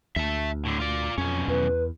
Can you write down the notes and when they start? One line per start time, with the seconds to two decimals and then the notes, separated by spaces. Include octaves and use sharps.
0.16 D2 E5 A5
0.65 A2 D3
0.80 F4 D5
1.18 B1 F2 C#4
1.48 E2 B4